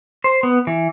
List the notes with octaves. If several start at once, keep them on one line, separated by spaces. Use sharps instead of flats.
C5
B3
E3